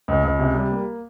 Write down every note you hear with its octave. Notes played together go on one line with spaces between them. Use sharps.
C#2
C#2
C3
G3
A#3